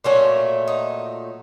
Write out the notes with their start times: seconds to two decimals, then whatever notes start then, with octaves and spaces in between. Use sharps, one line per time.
0.04 A#2 F#3 A3 C#4
0.67 D#4